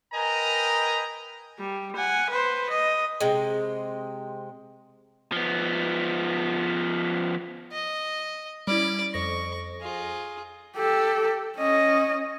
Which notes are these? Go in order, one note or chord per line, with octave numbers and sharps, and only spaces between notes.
A#4 B4 D#5 G5 G#5 A#5
G3
F#5 G#5
B4 C5
D#5
C3 G#3
F3 B3
D#5
G3 C#4 E4 D5
F2 C#6 A#6
F4 G#4
G4 A4
C#4 D#5